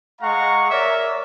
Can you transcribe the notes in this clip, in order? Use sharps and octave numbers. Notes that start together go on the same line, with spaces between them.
G#3 F5 F#5 A#5 C#6
A#4 C#5 D5 E5